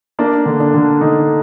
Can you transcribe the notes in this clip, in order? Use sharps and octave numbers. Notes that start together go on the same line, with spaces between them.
A#3 D4
D3
D4
D3
D3 D#4